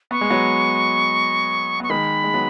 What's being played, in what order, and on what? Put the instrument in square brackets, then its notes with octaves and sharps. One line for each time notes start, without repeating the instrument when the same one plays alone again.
[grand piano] B3 [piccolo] C#6
[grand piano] G#3
F#3 B3
[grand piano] B3 [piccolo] C#6
[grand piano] D#3 G#3 [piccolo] B5
[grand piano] G#3
F#3 B3